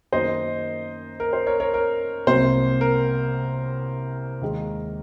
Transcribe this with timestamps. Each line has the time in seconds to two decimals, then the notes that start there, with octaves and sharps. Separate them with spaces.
0.12 F#2 D#3 A#3 D#4 C5 D#5
1.20 A#4
1.33 C5
1.46 A#4 C#5
1.60 A#4 C#5
1.74 A#4
2.27 C2 C3 F#3 A#3 C5
2.81 A#4
4.42 D#2 D#3 G#3